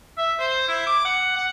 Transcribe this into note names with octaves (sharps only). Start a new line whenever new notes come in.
E5
C5
E4
D6
F#5
F#5